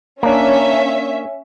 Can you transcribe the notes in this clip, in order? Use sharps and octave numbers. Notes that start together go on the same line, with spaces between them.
A#3 C#4 D4 E5